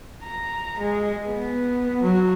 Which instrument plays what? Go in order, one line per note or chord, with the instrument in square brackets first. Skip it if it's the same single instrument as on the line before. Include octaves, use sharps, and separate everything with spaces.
[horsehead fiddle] A#5
G#3
B3
F#3